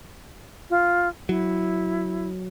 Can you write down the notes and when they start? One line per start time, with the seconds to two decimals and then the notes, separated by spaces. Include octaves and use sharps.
0.70 F4
1.29 F#3 E4